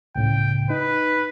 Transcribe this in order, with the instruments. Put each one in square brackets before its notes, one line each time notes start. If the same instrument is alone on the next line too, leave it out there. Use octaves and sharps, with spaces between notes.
[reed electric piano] C#2 A2 C#3 [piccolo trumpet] G5
[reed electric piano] D#4 [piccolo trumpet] B4